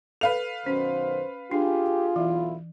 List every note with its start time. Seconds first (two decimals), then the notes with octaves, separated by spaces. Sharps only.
0.21 A4 B4 F5 F7
0.66 F#2 B2 D#3 C#4 C5
1.51 D4 F4 G4 G#4
2.16 B1 E2 E3 E4